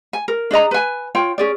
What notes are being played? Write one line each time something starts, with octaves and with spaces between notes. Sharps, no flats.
G#5
A#4
D4 G#4 D#5 A#5
B4 G#5
F4 C#5 G5
C#4 G#4 D5